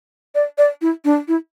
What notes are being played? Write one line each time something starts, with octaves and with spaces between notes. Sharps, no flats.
D5
D5
E4
D4
E4